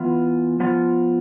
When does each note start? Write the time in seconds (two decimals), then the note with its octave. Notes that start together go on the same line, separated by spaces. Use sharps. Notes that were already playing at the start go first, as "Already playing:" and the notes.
Already playing: E3 B3 F4
0.60 F3 B3 F4